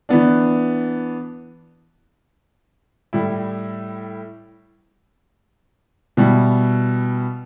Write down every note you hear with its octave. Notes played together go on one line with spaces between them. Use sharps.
E3 B3 D4
A2 G3 E4
B2 G3 E4